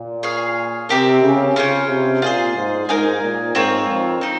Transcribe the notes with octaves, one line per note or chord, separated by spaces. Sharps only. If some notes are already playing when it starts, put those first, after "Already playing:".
Already playing: A#2
G#4 C#5 F5
C3 C4 G4 A#4
C#3
C#3 C#4 F4 C5 G5
C3
A#2 F4 G#4 C5
G#2
G#2 D#4 A#4 F5 G#5
A#2
G#2 C4 F4 A#4 C#5
F2
C4 D#4